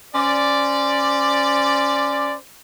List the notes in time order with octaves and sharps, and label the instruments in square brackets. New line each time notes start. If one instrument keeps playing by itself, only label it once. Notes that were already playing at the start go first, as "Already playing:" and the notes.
[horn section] C#4 C5 D5